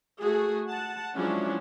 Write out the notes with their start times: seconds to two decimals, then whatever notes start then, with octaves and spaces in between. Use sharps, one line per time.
0.19 A3 F#4 G#4
0.65 F#5 A5
1.15 F3 F#3 G#3 C#4 D4 E4